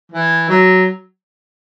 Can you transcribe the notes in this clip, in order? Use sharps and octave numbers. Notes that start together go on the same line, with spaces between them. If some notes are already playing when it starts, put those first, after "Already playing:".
E3
F#3